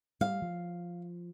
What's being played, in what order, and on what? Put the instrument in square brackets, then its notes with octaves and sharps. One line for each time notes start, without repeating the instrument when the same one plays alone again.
[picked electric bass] G3 [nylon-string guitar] F5
[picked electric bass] F3